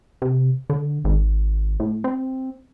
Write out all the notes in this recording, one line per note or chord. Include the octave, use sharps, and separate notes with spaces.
C3
D3
G#1
A2
C4